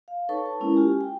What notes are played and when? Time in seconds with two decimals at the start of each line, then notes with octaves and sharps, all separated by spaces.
0.08 F5
0.29 D#4 A4 B4 C#5 A5 C#6
0.46 A5
0.60 G#3 A#3 C#4 E4 A#4
0.76 C#4 F4 G4 G#5
1.01 G5